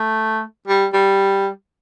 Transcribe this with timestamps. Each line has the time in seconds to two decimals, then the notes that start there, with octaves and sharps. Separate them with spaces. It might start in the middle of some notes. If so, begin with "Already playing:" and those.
Already playing: A3
0.68 G3
0.93 G3